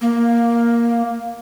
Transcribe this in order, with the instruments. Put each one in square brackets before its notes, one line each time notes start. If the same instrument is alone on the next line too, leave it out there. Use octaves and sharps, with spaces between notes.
[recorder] A#3